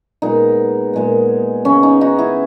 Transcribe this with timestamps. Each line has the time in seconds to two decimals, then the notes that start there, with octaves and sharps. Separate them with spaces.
0.22 A#2 G#3 B3 D#4
0.93 A#2 G#3 B3
1.65 C#3 G#3 B3 C#4
1.83 D#4
2.01 D#4 F#4
2.19 E4 G#4